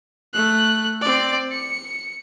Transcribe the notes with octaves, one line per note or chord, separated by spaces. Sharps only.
A3 F#6
C4 D5
C#7